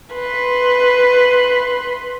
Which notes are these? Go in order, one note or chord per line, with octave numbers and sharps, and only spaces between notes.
B4 C6